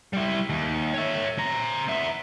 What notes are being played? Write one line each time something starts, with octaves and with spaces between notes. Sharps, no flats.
G3 E4
D#2
C#5 E5
C4 A#5
B3 E5